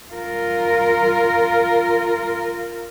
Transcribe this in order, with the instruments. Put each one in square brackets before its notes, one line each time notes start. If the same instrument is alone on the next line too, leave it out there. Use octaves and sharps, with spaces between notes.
[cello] F4 A#4